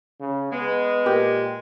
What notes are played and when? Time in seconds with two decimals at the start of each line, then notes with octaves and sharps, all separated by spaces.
0.20 C#3
0.52 G#3 B3 B4
1.06 A#2 G4 A#4